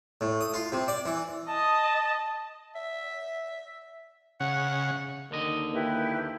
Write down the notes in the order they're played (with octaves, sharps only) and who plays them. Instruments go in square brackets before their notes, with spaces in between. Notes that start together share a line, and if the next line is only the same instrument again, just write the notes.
[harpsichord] A2
D#6
F4
C3
D5
E3
[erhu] D#5 [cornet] A5
[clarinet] E5
[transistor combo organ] C#3 [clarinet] F#5
[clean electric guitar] D#2 D3 D#5 [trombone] D#3
[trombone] A#3 [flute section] E4 G4 B4